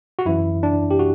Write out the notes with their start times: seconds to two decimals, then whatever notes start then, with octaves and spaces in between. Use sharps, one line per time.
0.19 F#4
0.26 F#2 E3 E4
0.63 D4
0.91 G4
0.99 F#4